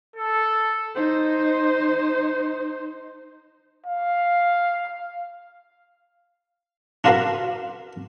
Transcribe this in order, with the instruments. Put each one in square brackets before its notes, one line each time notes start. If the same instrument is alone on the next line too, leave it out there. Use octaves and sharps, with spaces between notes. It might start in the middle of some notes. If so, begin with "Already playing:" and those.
[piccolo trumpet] A4
[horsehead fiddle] D#4 C5
[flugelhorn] F5
[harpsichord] D4 F4 F#4 A#4 B4 F5